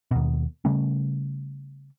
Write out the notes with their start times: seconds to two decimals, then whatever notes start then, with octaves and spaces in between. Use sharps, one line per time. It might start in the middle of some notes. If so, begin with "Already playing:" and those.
0.11 D#2 B2
0.65 C#3 G3 A3 C#4